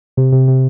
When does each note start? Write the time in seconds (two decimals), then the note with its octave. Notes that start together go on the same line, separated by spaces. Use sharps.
0.17 C3
0.32 C3
0.48 C3